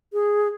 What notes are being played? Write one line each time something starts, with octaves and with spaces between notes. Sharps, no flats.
G#4